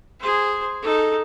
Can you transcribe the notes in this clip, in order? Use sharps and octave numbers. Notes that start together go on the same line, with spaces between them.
G#4 C5
D#4 A4